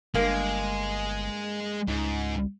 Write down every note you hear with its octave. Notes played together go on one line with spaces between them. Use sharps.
G1 G2 G#3 A#3
C#2 G#2